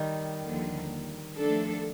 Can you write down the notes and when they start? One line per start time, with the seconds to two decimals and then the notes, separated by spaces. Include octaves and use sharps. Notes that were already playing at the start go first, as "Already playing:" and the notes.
Already playing: D#3 G3
0.44 D#2 D3 F3
1.39 F3 A3 D4 A4